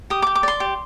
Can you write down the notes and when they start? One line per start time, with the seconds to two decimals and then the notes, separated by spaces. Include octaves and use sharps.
0.10 G4 D#6
0.22 D6
0.27 G4
0.35 D6
0.43 D5 C6
0.60 G4